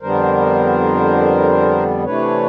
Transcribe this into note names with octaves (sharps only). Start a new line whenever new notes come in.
F2 D3 G3 B3 D4 A#4 C5
C3 E3 A3 D4 B4 C#5